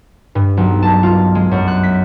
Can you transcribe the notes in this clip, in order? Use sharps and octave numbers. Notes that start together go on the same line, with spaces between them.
G2
B1
A5
F4
G#3
F#2
F#6
B6